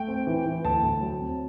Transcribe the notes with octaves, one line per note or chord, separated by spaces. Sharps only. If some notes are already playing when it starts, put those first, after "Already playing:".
Already playing: A3 G5
C4
E3
E3
D2 A5
D2
F#3
C4